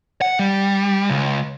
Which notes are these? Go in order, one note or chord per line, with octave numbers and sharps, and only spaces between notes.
F#5
G3
C#2